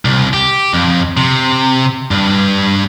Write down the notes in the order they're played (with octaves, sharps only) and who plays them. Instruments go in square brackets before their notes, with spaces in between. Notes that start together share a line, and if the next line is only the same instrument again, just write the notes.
[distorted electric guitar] C2
G4
F2
C3
G2